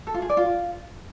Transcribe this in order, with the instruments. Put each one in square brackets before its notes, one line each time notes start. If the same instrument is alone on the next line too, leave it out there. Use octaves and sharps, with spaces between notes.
[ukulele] A4
F4
G#4
D5
F4